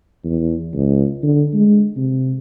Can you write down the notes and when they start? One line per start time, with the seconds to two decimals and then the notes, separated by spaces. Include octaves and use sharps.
0.24 E2
0.74 C#2
1.23 D3
1.54 G#3
1.96 C3